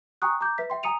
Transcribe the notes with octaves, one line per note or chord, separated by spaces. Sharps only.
G5 G#5 A#5 C#6 D#6 F#6
A#5 D6 G6
B4 E5 B6
E5 G5 C6
G#5 A#5 D#6 C#7 D#7 F7